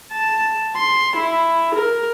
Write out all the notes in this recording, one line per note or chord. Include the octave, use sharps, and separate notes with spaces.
A5
C6
E4
A#4